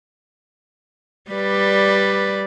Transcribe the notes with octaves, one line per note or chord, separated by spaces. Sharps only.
G3 B4 D5